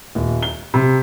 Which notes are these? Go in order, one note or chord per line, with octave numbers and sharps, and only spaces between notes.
D#1
G7
C3